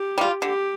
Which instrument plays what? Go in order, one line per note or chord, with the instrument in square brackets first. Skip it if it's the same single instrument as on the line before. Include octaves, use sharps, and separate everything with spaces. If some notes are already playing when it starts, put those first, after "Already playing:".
Already playing: [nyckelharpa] G4
[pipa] G3 F4
[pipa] D3 [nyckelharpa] G4